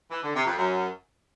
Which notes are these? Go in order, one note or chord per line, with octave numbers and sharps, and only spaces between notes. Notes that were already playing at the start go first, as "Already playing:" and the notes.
E3
D3
C3
F2
F#2